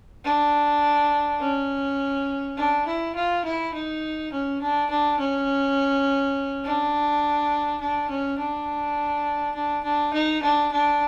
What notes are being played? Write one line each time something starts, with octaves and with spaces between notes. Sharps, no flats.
D4
C#4
D4
E4
F4
E4
D#4
C#4
D4
D4
C#4
D4
D4
C#4
D4
D4
D4
D#4
D4
D4